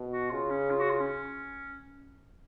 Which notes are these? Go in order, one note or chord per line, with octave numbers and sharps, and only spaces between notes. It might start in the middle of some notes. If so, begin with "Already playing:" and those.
Already playing: B2
F#4
C#3 F4
C#4
F4
F#4
F4
C#4